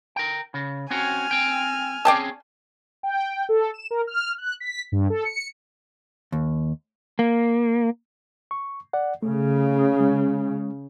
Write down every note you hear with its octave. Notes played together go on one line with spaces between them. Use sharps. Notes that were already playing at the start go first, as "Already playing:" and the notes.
A#4 G5
C#3
C4 C#4 F#4 G#5 F6
C4 G5
C4 C#4 G#4 D5 G5 A5
G5
A4
E7
A#4
F6
F#6
B6
G2
A4
C#7
D#2
A#3
C#6
D5 F#5
C#3 A3
G#3